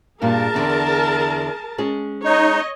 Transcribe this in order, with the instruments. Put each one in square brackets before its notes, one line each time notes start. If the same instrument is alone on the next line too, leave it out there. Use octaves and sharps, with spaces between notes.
[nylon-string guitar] G2 A#2 G3 [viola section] G#4 A#4 A5
[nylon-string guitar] E2 D3
G#3 C#4 G#4
[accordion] D#4 [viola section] C#5 D#5